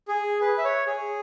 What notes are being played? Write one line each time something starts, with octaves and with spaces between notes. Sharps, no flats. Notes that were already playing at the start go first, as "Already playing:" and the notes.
G#4
B4
E5
C#5
G#4